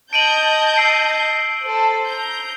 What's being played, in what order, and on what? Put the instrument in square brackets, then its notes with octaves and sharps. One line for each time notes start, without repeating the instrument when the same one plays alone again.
[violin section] D#5 A5 G6 [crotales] D7 D#7 F#7
[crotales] E6 C7 D7
[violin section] A4 C5
A#5 G6